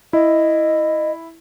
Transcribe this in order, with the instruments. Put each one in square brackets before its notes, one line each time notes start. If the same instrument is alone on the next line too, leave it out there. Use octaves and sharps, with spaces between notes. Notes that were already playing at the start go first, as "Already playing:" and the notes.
[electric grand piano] E4 [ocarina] D#5